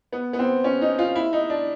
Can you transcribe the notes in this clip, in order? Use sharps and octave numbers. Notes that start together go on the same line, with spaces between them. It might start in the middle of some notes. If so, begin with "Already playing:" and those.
B3
B3
C4
C#4
D#4
F4
E4
D#4
D4